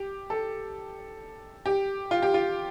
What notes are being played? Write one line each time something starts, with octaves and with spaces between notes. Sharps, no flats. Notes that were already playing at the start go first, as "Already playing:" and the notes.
Already playing: G4
A4
G4
F4
G4
F4